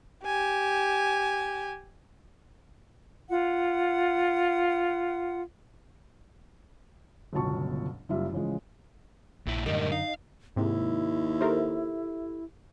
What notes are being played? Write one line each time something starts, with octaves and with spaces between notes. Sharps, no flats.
G4 G#5
F4 F#5
G1 C#2 B2 F#3 A5 C#6
F#1 G3 F4 E5
A1 C#3 F3 G#3
A#1 A#2 E4
F#2 A2 D3 D#3 G3 A#3
D#4 F5
D#2 G#2 C3 E4
G4 A4 A#4 C5 E5